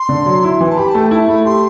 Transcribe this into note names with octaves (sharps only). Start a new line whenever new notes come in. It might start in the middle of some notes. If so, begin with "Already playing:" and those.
Already playing: C6
D3
F#3
E4
E3
A5
G4 B5
A5
A3 G5
E4 A5
A3 B5
G4 C6